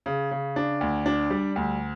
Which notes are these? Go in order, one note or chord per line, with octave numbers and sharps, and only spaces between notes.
C#3
C#3
D4
D2
D4
G3
D2